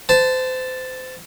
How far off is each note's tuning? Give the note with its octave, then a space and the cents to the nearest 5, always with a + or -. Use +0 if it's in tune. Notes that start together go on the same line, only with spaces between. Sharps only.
C5 -30 A5 +0